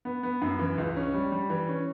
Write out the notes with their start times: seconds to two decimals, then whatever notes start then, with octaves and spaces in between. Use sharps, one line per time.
0.05 B3
0.23 B3
0.42 F#2
0.59 E3
0.78 C#2
0.96 C#4
1.14 G3
1.32 G3
1.50 E3
1.69 C#4